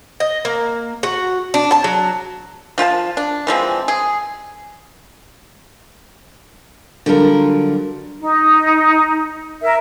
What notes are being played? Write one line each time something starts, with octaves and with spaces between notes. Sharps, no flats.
D#5
A#3
F#4
D4
A5
F#3
F3 F4 B4 A5
D4
E3 F3 G#3 C4
G#4
D3 F#3 G3 F4 A4 A#4
D#4
A#4 E5